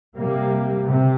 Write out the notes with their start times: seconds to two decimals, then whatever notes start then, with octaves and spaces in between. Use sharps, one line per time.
0.15 C3 G3 A#3
0.87 C3